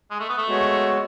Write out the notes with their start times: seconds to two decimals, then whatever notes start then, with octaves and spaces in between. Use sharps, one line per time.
0.10 G#3
0.20 A3
0.29 B3
0.37 A3
0.47 G#3 B3 F#4 C#5